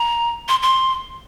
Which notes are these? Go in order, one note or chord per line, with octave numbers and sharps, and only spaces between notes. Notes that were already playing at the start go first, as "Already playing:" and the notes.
Already playing: A#5
C6
C6